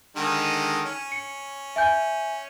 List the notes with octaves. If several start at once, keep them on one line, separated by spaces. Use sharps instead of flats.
D3 D#3 G#3
C#4
C#7
E5 G#5 G6